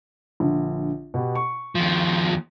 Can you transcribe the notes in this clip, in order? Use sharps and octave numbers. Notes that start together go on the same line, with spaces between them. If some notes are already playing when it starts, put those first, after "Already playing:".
A#1 D3
B2 B3 G4
C#6
D#2 F3